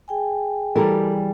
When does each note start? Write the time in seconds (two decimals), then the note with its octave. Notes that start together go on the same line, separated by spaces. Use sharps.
0.08 G#4 G5 G#5
0.76 E3 G3 G4 A4 A#4